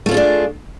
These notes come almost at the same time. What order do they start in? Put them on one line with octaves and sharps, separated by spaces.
A3 F4 C#4 G#4 D4